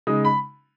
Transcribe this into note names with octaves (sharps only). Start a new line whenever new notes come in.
C#3 G#3 D#4 D#6
B5